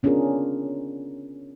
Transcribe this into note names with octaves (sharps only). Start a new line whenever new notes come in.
B3 C#4 D4 F4 G#4 A#4